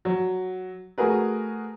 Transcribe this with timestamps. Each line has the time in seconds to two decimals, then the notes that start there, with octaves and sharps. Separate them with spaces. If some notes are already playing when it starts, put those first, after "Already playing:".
0.05 F#3
0.98 A3 F#4 G#4 A#4 B4